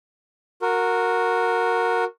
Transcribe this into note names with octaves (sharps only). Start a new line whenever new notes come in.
F#4 A#4